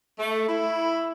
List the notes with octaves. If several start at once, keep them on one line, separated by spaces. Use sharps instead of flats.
A3
E4